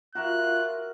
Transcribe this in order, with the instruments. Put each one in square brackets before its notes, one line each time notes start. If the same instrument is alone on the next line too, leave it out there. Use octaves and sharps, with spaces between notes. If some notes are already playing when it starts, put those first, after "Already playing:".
[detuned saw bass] F4 [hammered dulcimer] F#4 A#4 E5 [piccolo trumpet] F#6